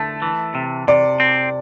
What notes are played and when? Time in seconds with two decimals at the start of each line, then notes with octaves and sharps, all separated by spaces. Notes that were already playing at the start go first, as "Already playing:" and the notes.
Already playing: D3 A3 A5
0.22 E3
0.55 C3
0.88 C3 D5
1.20 C4